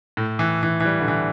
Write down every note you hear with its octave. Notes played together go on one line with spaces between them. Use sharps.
A2
E3
E3
E3
G3
D3
E3